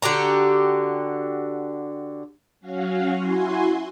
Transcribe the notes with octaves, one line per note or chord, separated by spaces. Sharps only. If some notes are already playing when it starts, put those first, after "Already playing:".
D3 F#4 G4 A#5
F#3 C#4 F#4 F5
E4 F#4 G#5 C6